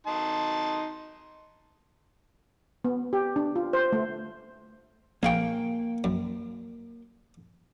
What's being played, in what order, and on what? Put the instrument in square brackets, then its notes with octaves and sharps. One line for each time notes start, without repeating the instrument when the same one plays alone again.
[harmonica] D#4 A5 C6
[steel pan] B3
G4
D4
F4
C5
A3
[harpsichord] A#1 G#4 C#6 [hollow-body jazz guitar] A#3 F5 G5
[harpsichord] F#2